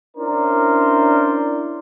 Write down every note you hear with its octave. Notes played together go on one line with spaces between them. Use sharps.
C#4 D4 E4 A#4 C5 D5